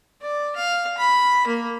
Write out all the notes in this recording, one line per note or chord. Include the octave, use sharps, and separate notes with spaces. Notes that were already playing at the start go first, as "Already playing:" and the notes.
D5
F5
B5
A#3